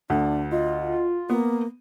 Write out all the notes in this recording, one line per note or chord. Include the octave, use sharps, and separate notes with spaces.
D2 D4
F4 D#5
A#3 B3